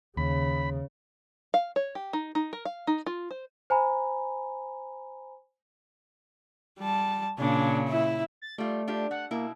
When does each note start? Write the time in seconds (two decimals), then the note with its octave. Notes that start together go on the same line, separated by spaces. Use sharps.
0.17 D#2 C#3 B5
1.54 F5
1.76 C#5
1.95 G4
2.13 D#4
2.35 D#4
2.53 A#4
2.65 F5
2.87 D#4
3.06 F4
3.31 C5
3.70 C5 G#5 A#5 B5
6.79 G3 A5
7.38 A#2 C#3 D4
7.89 E4 E5
8.42 A6
8.58 G3 A3 F4
8.88 D4 F4 G4
9.11 A3 F#5
9.31 B2 A#3 E4